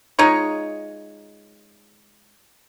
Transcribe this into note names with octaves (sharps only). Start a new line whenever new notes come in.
G#3 D#4 F4 C#5